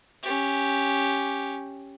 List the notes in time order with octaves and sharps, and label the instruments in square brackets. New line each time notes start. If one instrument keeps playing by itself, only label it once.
[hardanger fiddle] C#4 G4